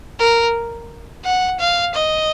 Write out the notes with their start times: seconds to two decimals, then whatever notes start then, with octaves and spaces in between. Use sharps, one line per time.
0.20 A#4
1.25 F#5
1.60 F5
1.94 D#5